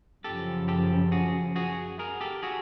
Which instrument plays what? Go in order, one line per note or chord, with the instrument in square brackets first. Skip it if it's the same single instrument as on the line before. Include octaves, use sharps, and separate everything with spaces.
[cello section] F#2 C#3 F3 [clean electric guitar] G4 A4
[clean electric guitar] G4 A4
F#4 G#4
F#4 G#4
G#4 A#4
G4 A4
F#4 G#4